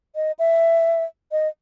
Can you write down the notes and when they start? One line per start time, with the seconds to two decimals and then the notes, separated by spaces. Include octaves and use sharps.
0.16 D#5
0.39 E5
1.32 D#5